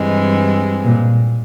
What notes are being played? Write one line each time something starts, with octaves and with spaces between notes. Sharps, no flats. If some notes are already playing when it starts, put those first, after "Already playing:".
Already playing: G2 E3 G#3 C4
A#2